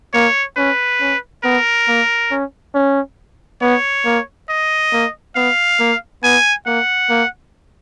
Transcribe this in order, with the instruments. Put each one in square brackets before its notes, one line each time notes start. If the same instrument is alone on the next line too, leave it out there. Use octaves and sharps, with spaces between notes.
[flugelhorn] A#3 [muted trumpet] C#5
[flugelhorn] C#4 [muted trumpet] B4
[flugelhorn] C#4
[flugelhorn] B3 [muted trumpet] A#4
[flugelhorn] A#3
C#4
C#4
[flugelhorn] B3 [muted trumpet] C#5
[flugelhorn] A#3
[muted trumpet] D#5
[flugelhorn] A#3
[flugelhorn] B3 [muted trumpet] F5
[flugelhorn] A#3
[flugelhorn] B3 [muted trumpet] G#5
[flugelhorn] A#3 [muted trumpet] F#5
[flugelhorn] A#3